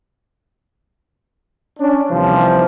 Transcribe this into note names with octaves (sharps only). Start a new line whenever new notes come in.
C#4 D4
D#2 C3 E3 F3 G3